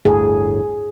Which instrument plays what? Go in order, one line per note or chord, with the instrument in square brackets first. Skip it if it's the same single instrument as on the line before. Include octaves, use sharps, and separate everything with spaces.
[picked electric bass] G1 D2 A2 [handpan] G#4